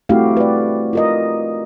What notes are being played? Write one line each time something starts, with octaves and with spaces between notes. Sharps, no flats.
A3 C4 E4 F#4 G4 F5
B4 D5
F4 A#4 D#5